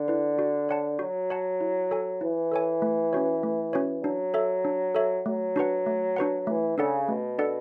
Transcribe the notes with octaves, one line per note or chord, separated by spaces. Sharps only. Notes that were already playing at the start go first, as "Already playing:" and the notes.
Already playing: D3
E4 B4
F#4
C#5 F#5 A5
F#3 F#4
C#5 F#5 A5
E4
A4 C#5 G#5
E3 E4
A4 C#5 G#5
A3
C#4 F#4 C#5
A3
C#4 F#4 C#5
F#3 D4
A4 C#5 E5
D4
A4 C#5 E5
F#3 A3
D4 F#4 B4 F#5
A3
D4 F#4 B4 F#5
E3 A3
C#3 D4 A4 D5 F#5
B2 A3
D4 A4 D5 F#5